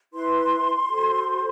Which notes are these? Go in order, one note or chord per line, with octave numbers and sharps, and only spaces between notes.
E4 B4 C6
F#4 A4 C5